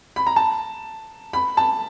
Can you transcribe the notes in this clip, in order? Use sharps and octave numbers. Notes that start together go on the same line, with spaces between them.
B5
A#5
A5
B5
A5